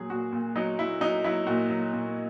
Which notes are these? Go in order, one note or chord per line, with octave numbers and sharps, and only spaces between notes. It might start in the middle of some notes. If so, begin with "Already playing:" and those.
Already playing: A#2 F#3 G#4
A#2 F#4
A#2
F#3 D#4
F#3 E4
F#3 D#4
F#3 E4
A#2 F#4
F#3
A#2